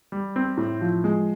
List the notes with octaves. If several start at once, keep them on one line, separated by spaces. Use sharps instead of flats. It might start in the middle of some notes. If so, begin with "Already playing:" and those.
G3
C4
A2
F3
G#3